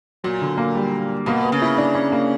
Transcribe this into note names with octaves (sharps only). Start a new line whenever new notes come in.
A#2 F#3
D3
A#3
G3
B2 A#3
B3
C#3
E4
D4
C#4
A#3